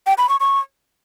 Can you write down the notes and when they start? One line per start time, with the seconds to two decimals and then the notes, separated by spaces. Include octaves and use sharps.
0.07 G5
0.18 B5
0.29 C#6
0.40 C#6